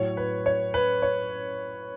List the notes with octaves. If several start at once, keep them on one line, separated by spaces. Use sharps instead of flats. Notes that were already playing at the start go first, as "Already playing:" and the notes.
Already playing: A2 F#3 C#5
B4
C#5
B4
C#5